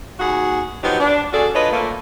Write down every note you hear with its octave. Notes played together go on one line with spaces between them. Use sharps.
D#2 F#4 G#4 F#5
F3 F#3 B3 D#4 G4
D4
C#4 F#4 G#4 A4 D5
D4 F4 B4 C#5 D#5
A#2 A3 A#3